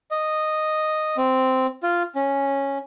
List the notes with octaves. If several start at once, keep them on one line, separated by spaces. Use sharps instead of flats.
D#5
C4
F4
C#4